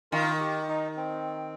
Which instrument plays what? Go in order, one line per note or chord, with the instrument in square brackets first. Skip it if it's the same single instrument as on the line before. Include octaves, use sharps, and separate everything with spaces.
[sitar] D#3 [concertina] F4 A#4
[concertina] G4
D#4
C4